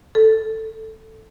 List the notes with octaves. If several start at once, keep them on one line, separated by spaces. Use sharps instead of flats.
A4